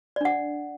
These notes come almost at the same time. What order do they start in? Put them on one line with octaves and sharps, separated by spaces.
D5 D4 F#5